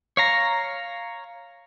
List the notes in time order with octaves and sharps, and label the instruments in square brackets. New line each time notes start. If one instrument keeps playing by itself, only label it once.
[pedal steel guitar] C#5 F5 A#5